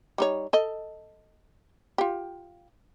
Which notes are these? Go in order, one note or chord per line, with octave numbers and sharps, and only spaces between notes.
G3 D#4 C#5
A4 D#5
F4 G4